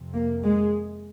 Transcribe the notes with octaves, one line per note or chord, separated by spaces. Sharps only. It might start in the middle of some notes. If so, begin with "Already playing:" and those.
Already playing: F2 C3
A#3
G#3